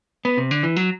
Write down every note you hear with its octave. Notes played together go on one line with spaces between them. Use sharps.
B3
C3
D3
E3
F#3